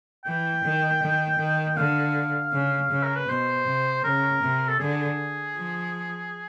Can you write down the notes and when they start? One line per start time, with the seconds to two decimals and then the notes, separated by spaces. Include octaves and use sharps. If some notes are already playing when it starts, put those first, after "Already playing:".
0.25 E3 G5
0.63 D#3
1.01 D#3
1.39 D#3
1.76 D3 F5
2.52 C#3
2.90 C#3
3.03 A#4
3.16 B4
3.28 B2 C5
3.66 C3
4.04 C#3 A#4
4.41 C3
4.68 A4
4.80 D3 G#4
5.56 F3